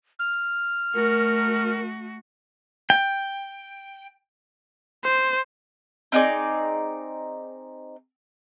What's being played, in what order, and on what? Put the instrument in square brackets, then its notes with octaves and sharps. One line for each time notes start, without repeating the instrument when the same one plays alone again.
[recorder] F6
[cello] A3 F#4 [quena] A#4
[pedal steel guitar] G5
[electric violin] C5
[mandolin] C4 D#4 G#4 D5